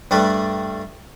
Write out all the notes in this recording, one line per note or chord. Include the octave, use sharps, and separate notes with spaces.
G2 G3 A3 B4